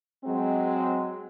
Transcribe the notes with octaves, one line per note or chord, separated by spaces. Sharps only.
F#3 G#3 C4